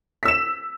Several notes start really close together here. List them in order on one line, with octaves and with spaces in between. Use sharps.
B6 E6 E7